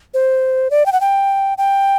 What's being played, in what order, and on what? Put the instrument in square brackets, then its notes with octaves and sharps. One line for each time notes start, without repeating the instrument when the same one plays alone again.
[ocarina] C5
D5
G5
F#5
G5
G5